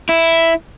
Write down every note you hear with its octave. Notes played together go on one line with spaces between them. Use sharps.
E4